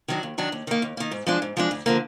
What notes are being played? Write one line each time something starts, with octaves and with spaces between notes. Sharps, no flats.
D#3 F#3 D4
D#2
D#3 F#3 D4
D#2
D#3 A#3
D#2
D#3 A#3
G#2
F3 G#3 D4
G#2
F3 G#3 D4
D2
D3 F3 A#3